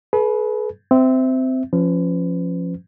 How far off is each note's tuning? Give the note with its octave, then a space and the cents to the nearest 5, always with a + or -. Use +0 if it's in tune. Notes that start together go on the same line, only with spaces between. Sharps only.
G#4 +45 B4 -15
C4 -15 E5 +0
F3 +0 C#4 -10 B4 +35